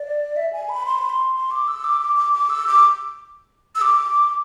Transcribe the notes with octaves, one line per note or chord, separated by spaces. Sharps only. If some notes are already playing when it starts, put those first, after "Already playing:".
Already playing: D5
E5
G#5
B5
C6
B5
C6
C6
D6
E6
D6
D6
D6
D6
E6
D6
E6
D6